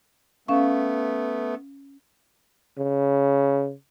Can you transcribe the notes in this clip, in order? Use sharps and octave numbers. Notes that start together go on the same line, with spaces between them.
A3 B3 C#4 F5 C#6
C#3